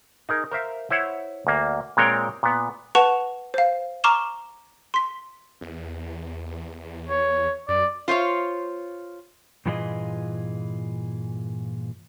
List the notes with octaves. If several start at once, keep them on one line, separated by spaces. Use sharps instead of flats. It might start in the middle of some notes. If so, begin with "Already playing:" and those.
D#4 G#4 A#4
A#4 C5 E5 F5
E4 C5 C#5 E5 F#5
D2 A#3
A#2 G#3 C4 A#4 C#5 G5
A#2 B3
B4 F#5 A5 C#6 E7 F7
C5 F5
A#5 C#6 D6 F6 E7 G7
C6 B6
E2
C#5
F#2 D5
F4 C5 C#5 F5
G2 A#2 E3 F4 G#4 D#5